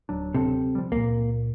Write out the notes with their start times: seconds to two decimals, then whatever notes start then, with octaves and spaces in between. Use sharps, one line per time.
0.09 D1 F#3 D4
0.35 C3 A4
0.75 F3 G3
0.92 C#2 A#2 A#3